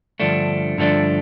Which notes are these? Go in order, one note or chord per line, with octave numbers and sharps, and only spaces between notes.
G2 D3 F3 A3 D4
G2 D3 F3 A3 D4